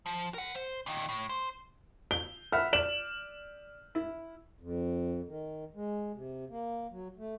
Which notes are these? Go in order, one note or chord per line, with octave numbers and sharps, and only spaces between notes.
F3
A#4 F#5
C5
A#2 D#3
A2
C5
G7
E5 F#5 B5 F6
D5 E7 F#7
E4
F2
D#3
G#3
C3
A#3
F#3
A3